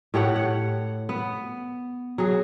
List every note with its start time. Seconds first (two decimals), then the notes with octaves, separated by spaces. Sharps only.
0.14 A2 G4 C#5 F#5
0.36 F#5
1.09 B3
2.18 F#3 G#4